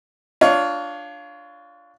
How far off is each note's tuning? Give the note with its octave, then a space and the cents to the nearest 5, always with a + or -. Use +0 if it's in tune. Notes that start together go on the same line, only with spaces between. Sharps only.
D4 +5 F4 +0 C#5 +25